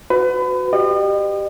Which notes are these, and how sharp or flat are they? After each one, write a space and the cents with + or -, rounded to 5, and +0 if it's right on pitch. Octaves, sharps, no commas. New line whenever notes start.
F#4 -5 B4 +35
G4 +0 D#5 -40